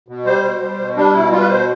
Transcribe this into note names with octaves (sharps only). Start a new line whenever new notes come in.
B2
G3 C5
B2
G3
B2
G3 D4
B2 E4
G3 F4
B4
B2 C5